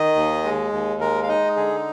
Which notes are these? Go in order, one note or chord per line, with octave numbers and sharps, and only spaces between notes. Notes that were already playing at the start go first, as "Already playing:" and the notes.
Already playing: D#3 D#5
D#2
G#3
D#2
G#3 A#4
F5
D#4 D#5
D3 G#4